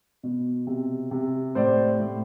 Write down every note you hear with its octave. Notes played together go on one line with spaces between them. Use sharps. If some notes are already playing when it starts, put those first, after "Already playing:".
B2
C3
C3
A2 C5 D5
A2